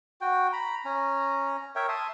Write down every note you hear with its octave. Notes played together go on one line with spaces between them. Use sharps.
F#4 G5
A#5 B5
C#4 A#5
A#4 C#5 E5 G5
E5 A5 C6 D#6